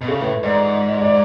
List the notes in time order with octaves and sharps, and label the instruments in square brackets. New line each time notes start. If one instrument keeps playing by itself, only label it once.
[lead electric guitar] B2
[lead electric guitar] C#3 [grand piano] A4
[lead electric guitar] A2 [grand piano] B4
[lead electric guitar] G#2 [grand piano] D5
[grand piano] D5